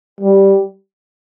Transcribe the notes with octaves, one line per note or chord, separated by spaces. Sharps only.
G3